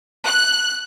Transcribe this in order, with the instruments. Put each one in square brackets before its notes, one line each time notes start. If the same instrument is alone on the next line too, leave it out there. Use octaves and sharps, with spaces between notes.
[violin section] F#6